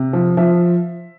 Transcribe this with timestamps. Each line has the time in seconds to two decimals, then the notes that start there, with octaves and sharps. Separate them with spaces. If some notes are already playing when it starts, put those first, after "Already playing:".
Already playing: C3
0.13 F3
0.37 F3 E5